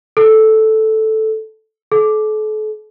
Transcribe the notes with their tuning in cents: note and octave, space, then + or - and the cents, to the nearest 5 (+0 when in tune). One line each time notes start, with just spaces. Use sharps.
A4 -5
A4 -40